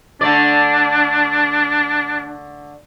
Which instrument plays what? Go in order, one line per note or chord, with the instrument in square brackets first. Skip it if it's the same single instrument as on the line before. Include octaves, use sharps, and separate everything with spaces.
[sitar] D3 A3 D5 [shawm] D4